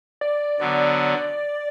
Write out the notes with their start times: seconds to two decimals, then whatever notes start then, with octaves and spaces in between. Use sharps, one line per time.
0.21 D5
0.60 D3 F#3 B3 D5